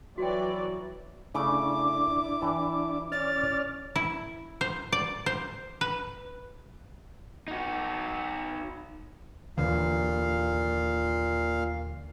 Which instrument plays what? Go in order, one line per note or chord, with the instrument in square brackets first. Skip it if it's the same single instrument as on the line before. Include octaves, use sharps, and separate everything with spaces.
[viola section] E3 F#3 D5 [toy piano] F#4 G5
[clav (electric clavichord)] C#3 A3 [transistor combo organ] D4 E4 [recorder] D6
[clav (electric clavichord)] E3 G5 A5
[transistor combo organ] C#4 D5 F6 [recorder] A6
[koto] E4
C5
D5
C5
B4
[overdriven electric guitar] D#4 F#4
[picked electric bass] D#2 D3 E3 [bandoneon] A#2 F5